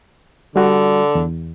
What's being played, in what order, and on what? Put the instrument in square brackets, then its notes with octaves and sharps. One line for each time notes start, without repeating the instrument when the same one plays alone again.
[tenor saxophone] D3 [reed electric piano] G3 F#4
[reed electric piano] E2